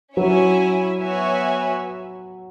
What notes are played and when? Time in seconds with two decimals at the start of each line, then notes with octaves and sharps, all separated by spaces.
0.16 F#3 C#4 E4 C#5 E5 G#5
1.01 B3 F#4 C#5 E5 G#5